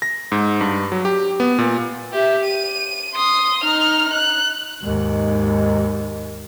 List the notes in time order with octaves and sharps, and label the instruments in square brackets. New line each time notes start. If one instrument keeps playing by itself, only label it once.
[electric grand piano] A#6
G#2
G2
F#3
G4
B3
A#2
[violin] G4 E5
D#7
C6 D#6
D#4 F6
F#6
[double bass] D#2 G#2